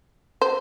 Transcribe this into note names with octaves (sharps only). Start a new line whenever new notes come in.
C5